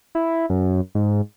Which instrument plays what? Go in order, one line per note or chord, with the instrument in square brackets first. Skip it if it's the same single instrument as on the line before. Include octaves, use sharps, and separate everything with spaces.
[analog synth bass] E4
F#2
G#2